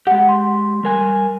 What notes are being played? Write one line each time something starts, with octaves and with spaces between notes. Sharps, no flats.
G#3 G4 F#5
C6
G3 A#4 G#5